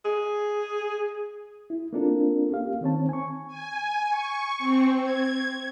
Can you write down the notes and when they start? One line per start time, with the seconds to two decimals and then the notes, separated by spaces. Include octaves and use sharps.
0.05 G#4
1.70 E4
1.93 A#3 C4 D4 F4 A4 A#4
2.50 A#3 C#4 G4 F5
2.81 D#3 C4 C#5 A5
3.09 G#5 C#6
3.47 G#5
4.08 C#6
4.58 C4
5.01 G#6